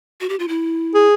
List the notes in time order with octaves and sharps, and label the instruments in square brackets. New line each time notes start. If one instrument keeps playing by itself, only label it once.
[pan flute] F#4
G4
F4
E4
[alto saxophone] G#4